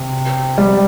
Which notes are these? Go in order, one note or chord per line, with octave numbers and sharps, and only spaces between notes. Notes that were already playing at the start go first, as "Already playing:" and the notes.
Already playing: C3
G3